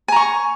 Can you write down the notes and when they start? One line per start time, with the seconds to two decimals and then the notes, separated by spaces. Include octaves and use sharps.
0.08 G#5
0.12 A#5
0.16 C#6